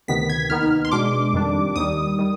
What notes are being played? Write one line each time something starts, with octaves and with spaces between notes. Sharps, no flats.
D2 C3 D#3 B3 B6
G#6
D#2 D#3 B3 D#4 F6
C6
B2 G#3 D4 D6
F2 D#3 G3 D4
D#2 D#3 G3 D#6
D#3 G3